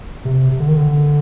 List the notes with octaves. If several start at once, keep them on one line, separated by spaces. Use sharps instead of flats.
C3
D3
D#3
D3